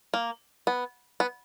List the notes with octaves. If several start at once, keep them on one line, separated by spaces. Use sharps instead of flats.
A#3
B3
B3